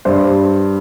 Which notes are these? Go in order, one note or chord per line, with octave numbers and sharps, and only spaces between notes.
G2 C5